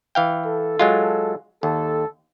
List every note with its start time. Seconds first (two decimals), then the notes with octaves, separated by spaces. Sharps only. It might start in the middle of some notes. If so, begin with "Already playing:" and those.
0.15 E3 F5 G5
0.46 A4
0.79 F#3 G#3 F4
1.63 D#2 A4